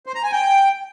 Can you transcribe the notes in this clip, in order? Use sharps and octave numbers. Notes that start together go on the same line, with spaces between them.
C5
A#5
G#5
G5